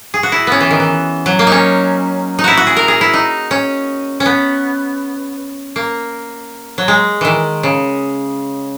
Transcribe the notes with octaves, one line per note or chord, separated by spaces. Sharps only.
G#4
F#4
E4
B3 C#4
E3
D#3
E3
F#3
A#3
C#4 D#4
D#4
E4 F#4
F#4
G#4
A#4
G#4
E4
D#4
C#4
C#4
B3
A#3
F#3
G#3
D#3 E3
C#3